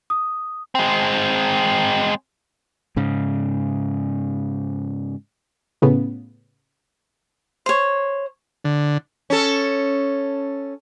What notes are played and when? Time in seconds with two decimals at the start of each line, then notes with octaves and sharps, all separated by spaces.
0.10 D#6
0.75 G#3 C4
2.96 G#2 C#3
5.82 A2 C#3 B3
7.66 C5 C#5
8.65 D3
9.30 C#4 A4